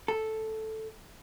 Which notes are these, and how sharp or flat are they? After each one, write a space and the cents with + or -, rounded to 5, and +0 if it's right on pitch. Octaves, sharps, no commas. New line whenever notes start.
A4 +0